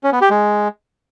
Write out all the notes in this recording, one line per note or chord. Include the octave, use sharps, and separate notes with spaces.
C#4
B3
G4
G#3